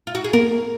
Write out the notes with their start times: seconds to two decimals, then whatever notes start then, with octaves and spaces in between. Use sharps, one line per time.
0.07 F4
0.15 F#4
0.24 G#4
0.33 A#3 A#4